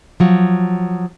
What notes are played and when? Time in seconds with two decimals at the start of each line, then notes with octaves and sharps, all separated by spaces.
0.20 F3 F#3